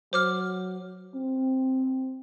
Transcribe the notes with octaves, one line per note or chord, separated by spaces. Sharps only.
F#3 C5 D6 F6
C4